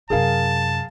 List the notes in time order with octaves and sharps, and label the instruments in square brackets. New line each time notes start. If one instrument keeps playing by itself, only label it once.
[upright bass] F#2 C3 [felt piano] G#4 A#4 F5 [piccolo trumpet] A5